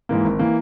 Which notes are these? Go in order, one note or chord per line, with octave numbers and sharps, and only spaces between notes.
G#2 E3 A#3
G#1
E3 A#3